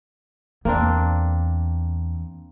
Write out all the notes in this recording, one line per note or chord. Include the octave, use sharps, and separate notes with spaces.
E2 A#3 C4 D4